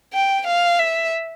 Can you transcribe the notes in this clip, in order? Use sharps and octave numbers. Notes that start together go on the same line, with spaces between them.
G5
F5
E5